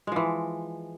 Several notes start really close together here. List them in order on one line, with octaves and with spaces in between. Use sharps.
G#3 F3 E3